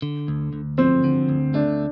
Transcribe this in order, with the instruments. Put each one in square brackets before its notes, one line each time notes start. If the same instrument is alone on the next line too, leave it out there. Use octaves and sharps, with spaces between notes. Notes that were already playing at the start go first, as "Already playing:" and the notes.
[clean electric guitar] D3
D2
D2
[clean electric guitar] F3 [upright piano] C4
[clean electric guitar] D3
D2
[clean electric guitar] A3 [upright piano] D4